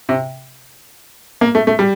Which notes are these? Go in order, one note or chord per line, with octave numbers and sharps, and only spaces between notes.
C3
A#3
A3
A3
G3